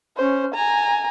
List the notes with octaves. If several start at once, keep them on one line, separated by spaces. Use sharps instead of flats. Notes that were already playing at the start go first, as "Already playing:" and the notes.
C#4 C5
G#5 A#5